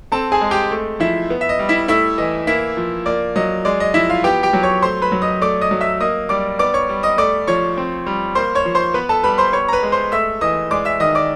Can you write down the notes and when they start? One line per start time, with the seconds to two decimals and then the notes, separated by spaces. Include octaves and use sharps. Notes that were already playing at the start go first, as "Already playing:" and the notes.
0.12 C4 A4 A5
0.32 G#4 G#5
0.41 G#3
0.51 G4 G5
0.71 A3
1.00 F3 E4 E5
1.30 B3
1.41 E5
1.49 D#5
1.59 G3
1.69 E4 E5
1.88 A3 E4 E5
2.18 E3 D#5
2.47 A#3 E4 E5
2.77 F3
3.06 A#3 D5
3.36 F#3 D#5
3.65 G#3 D5
3.80 D#5
3.94 F3 E4 E5
4.10 F4 F5
4.24 B3 G4 G5
4.43 G4 G5
4.53 F#3
4.63 C#5 C#6
4.82 A3 C5 C6
5.02 B4 B5
5.12 F#3
5.22 D#5 D#6
5.41 A3 D5 D6
5.61 D#5 D#6
5.71 F#3
5.81 E5 E6
6.01 A#3 D#5 D#6
6.29 G3 D5 D6
6.59 B3 D5 D6
6.74 C#5 C#6
6.89 G3
7.03 D#5 D#6
7.18 A3 D5 D6
7.47 F3 C#5 C#6
7.77 C4
8.06 G3
8.35 A#3 C5 C6
8.55 C#5 C#6
8.65 F3
8.75 C5 C6
8.94 B3 B4 B5
9.09 A4 A5
9.23 G3 B4 B5
9.38 C5 C6
9.53 B3 C#5 C#6
9.68 A#5
9.73 B4 B5
9.83 G#3
9.92 C5 C6
10.12 A3 E5 E6
10.41 E3 D#5 D#6
10.71 G#3 D5 D6
10.85 E5 E6
11.00 D#3 D#5 D#6
11.15 D5 D6